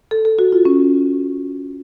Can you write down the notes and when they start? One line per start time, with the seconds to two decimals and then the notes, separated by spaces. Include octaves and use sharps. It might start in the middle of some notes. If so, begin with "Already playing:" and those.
0.11 A4
0.25 A4
0.39 F#4
0.52 F4
0.65 C#4